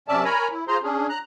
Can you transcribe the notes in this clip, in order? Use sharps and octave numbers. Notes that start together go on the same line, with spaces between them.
F#2 C3 C#4 D5 E5 A5
A#4 C#5 G#5 A#5 B5
E4
F4 G#4 C5 A#5 C6
C#4 D4 G#4
A#5 F#6